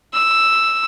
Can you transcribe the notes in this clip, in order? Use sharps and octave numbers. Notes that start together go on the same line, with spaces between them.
E6